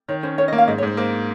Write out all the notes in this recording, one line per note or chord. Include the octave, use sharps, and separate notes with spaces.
D#3 C#5
C#4 C5
C#4 C#5
D#5
A#3
F5
G#2 D#5
C#5
G#2 C5
A#3 C5